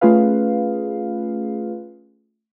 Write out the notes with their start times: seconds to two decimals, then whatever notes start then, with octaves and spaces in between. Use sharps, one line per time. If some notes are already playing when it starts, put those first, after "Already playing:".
0.01 A3 C#4 F4 G#4 B4 F5